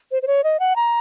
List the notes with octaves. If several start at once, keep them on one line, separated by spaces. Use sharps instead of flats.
C5
C5
C#5
D#5
F#5
A#5